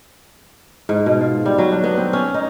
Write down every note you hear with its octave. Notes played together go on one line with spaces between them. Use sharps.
G#2
B2
F4
G3
F#3
D4
B3
C4
C#4
D#4